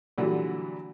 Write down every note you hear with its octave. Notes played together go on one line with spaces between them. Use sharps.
A#2 D3 E3 F#3 G3